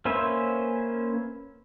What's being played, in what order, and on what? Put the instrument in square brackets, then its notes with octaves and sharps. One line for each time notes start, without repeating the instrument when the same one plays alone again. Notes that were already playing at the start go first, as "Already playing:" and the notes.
[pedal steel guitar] A#3 C#4 B4 C5 E5